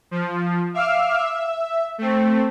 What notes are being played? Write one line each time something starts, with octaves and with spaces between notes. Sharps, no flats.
F3
E5 F5 D6 E6 F6
E5
A3 C4